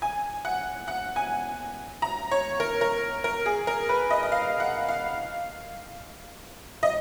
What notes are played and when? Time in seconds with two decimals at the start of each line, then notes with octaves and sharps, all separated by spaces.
0.02 G#5
0.45 F#5
0.88 F#5
1.16 G#5
2.02 A#5
2.31 C#5
2.60 A#4
2.81 A#4
3.24 A#4
3.46 G#4
3.67 A#4
3.89 B4
4.10 D#5
4.23 D#5
4.32 F5
4.60 F#5
4.89 F5
6.83 D#5